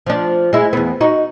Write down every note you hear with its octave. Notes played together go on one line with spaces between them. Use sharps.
F3 D4
G#3 E4
E2 B3
D#4 F#4